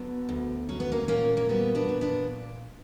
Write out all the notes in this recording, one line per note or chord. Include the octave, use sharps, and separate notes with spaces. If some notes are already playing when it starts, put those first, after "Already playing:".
Already playing: D3 F#3 B3
D2
F#3 C#4
B3
A#3 C#4
A#2 A#3 C#4
A#3
F#3 G3 B3
B3 D4
A#2
B3 D4